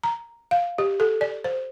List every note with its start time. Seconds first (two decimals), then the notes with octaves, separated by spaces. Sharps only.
0.04 A#5
0.51 F5
0.78 G4
1.00 A4
1.21 D5
1.44 C5